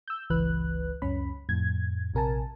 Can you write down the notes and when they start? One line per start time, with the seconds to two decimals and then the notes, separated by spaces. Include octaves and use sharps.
0.08 E6 G6
0.30 G1 C#2 E3 B4 F#6
1.02 C#2 F#2 C#4 B5
1.49 F2 A2 G#6
2.14 A#1 C3 A#4 G#5 A5